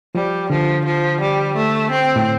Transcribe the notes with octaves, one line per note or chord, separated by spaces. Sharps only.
F3 G3
D3 F3
F3
G3
A3
C4
A2